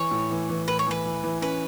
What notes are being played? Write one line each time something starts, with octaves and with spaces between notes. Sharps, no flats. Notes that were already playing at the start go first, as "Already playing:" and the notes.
Already playing: E3 C#5
A2
E3
E3
A2 B4
C#5
E3 B4
E3
E3
C#4 B4